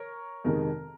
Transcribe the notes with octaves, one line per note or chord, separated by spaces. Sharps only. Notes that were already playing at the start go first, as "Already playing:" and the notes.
Already playing: A#4 C#5
F2 C3 D#3 G#3 A#4